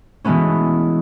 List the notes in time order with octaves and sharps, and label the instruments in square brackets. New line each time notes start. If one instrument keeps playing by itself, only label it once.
[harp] B2 E3 G#3 A3 B3 C#4